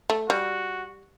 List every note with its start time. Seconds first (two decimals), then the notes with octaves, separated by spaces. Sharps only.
0.10 A3
0.29 G3 F#4